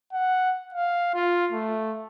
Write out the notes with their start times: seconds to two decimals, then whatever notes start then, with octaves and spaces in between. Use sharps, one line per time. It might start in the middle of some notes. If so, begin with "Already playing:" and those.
0.13 F#5
0.74 F5
1.14 F4
1.52 A3